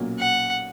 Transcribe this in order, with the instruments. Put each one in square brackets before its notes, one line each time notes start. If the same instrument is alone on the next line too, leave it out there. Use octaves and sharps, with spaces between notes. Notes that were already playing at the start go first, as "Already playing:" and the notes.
Already playing: [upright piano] B1 A#2 F#3 A#3 C#4
[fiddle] F#5